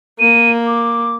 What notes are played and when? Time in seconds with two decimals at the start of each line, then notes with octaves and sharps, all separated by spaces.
0.20 A#3 D#7
0.67 D6